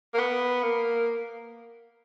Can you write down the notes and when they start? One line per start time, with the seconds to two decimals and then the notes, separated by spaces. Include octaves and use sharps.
0.14 A#3
0.18 B3
0.63 A#3